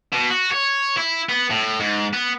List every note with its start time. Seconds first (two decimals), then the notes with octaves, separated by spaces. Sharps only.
0.13 B2
0.30 F#4
0.51 C#5
0.98 E4
1.29 B3
1.50 A2
1.80 G#2
2.14 B3